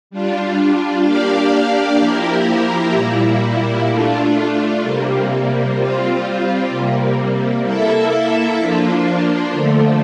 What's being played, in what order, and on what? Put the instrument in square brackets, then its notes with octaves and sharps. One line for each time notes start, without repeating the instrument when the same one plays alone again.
[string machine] G3 D4 F4
A#3 D4 G4 D5 F5
F3 A#3 E4 G4 A#4
A#2 G3 A#3 E4
A3 D4 F4
C3 G3 A#3
G3 C4 F4
C3 G3 A#3
A#3 E4 A4 E5
F3 A#3 D4 F4
D3 F3 A3